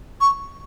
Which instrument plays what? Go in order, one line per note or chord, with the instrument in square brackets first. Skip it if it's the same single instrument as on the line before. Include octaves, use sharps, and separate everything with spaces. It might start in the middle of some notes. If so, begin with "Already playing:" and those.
[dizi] C#6